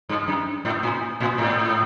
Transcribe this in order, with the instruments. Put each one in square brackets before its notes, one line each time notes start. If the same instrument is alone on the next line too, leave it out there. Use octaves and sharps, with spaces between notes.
[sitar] G2
F#2
G#2
A2
A2
G#2